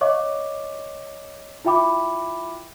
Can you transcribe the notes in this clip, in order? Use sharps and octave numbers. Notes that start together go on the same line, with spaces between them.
C#5 D#5 F5 C#6 D6
E4 F4 E5 G5 B5 D6